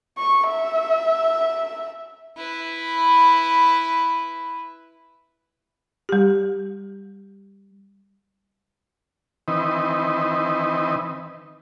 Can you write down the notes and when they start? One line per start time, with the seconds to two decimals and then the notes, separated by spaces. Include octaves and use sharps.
0.18 C#6
0.50 E5
2.37 E4 B4
6.09 G3 G4
9.48 D#3 E3 C4 D#4 B4